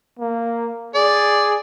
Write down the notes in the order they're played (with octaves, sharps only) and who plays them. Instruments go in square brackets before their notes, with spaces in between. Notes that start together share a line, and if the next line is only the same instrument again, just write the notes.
[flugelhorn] A#3
[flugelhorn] G#4 [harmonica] D5